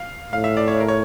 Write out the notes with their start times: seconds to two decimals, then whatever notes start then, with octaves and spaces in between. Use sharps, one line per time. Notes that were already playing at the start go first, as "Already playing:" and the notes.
Already playing: F5
0.32 A2 F5
0.44 E5
0.57 D5
0.68 C#5
0.80 A#4
0.88 C#5